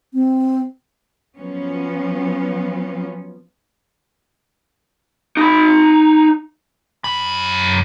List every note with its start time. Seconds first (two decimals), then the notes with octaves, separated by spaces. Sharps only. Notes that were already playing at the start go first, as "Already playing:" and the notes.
0.14 C4
1.36 F3 F#3 B3 C#4
5.37 D#4 B5
7.04 F#2 B5